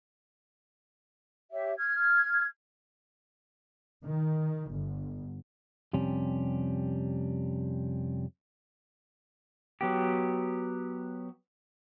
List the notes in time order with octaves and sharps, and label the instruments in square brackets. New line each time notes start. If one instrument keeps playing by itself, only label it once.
[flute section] G4 C#5 E5
F6 G#6
[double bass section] D#3
G1
[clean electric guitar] F2 C3 G3 C#4
[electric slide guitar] F#3 B3 G4